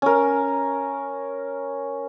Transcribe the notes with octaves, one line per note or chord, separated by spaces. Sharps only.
C#4 A#4